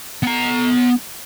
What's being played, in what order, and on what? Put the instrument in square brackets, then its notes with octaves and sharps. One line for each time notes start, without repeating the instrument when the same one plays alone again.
[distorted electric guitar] B3 A#5